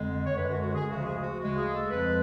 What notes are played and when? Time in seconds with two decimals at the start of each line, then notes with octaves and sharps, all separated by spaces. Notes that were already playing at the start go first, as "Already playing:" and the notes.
Already playing: F2 D3 G#3
0.25 C#5
0.36 F#2 D3 G#3 B4
0.50 F#4
0.61 F#4
0.74 G#4
0.87 D2 C#3 F3 G#3 F#4
1.05 G#4
1.21 F#4
1.39 D2 C#3 G#3 F#4
1.56 G#4
1.73 A4
1.90 F2 F3 G#3 B4